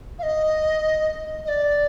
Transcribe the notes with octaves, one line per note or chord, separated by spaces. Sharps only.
F5
D#5
D#5
D5